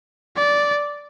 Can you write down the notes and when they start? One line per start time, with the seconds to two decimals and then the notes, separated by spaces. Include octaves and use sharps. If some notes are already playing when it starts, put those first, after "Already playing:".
0.37 D5